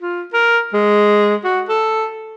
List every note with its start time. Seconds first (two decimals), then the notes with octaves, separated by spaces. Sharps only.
0.02 F4
0.33 A#4
0.74 G#3
1.44 F#4
1.68 A4